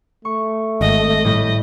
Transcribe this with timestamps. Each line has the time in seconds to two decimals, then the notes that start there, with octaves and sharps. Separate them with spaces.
0.25 A3 C#6
0.81 G#1 D#5
1.25 A2 G3